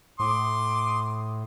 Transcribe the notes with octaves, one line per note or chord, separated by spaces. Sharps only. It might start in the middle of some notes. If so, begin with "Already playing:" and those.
A2 C6 D6 D#6